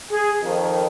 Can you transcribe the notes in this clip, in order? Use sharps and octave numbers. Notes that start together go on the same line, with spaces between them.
G#4
F2 D#3